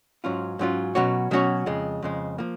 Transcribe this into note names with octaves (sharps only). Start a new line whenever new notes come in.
G#2 F#3 C#4 F4
G#2 F#3 C#4 F4
B2 F#3 C#4 F#4 C#5
B2 F#3 C#4 F#4 C#5
F2 C#3 G#3
F2 C#3 G#3
F3 A#3